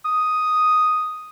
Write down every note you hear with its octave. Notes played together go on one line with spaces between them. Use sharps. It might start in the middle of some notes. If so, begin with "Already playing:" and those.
D#6